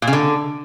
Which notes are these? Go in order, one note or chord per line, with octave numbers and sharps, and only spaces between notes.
A#2
C#3
D3